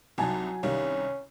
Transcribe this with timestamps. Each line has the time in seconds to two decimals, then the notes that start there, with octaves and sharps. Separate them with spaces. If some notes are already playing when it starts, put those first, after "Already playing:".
0.18 C2 F#3 D#4 G#5 A5
0.63 C2 D#3 G3 C#4 F5